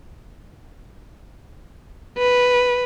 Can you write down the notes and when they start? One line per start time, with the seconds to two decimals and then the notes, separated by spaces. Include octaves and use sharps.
2.18 B4